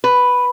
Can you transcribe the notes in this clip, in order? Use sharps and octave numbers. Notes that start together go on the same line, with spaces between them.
B4